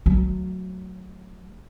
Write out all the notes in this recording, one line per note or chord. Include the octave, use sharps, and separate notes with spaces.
F#3 A3